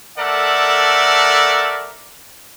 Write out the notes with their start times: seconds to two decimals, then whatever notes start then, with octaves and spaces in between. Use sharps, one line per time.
0.18 A3 A4 A#4 D5 E5 F#5